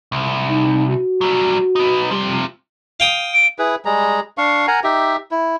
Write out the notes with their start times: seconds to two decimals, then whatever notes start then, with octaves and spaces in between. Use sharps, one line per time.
0.12 C2
0.49 D#4
0.88 F#4
1.21 F#3 G3
1.76 B3 D#4
2.11 C3 F3 G3
3.00 F5 G5 D#6
3.34 D7
3.59 E4 G#4 B4
3.85 G3 G#3 G#4 A#5
4.38 D4 F5 C#6
4.68 A#4 F#5 G#5 A#5
4.84 D#4 G4 E5
5.31 E4